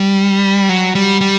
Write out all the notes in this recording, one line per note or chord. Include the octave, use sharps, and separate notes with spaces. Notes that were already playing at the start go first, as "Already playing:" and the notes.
Already playing: G3
F#3
G3
G3